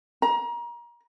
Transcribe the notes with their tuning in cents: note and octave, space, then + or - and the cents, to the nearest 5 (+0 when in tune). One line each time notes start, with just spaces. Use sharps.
A#5 +30